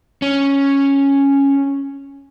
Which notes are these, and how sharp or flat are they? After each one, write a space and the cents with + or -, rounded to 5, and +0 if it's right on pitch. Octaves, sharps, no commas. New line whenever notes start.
C#4 +0